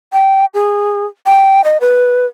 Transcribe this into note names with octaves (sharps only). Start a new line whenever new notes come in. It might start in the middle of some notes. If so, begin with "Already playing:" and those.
G5
G#4
G5
D#5
B4